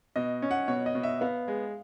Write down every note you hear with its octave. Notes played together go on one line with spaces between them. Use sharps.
B2 D#5
C#4
F#5
B2 C#5
D#5
B2
E5
B3 F5
G#3